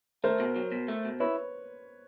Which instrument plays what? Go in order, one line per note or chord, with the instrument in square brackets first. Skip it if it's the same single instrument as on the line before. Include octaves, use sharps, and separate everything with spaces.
[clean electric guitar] A3 [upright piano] A#4 C5
[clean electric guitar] B2
F#3
B2
A3
B2
[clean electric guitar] E4 [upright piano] B4 C#5